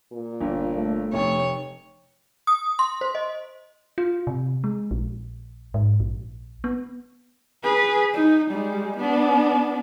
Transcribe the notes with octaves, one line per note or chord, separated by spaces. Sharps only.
A#2
G1
A3
F1 C#5
D#6
C6
C5
D#5
F4
C3
G#3
A#1
G#2
A#1
B3
G#4 B4
D#4
G3 G#3
B3 D4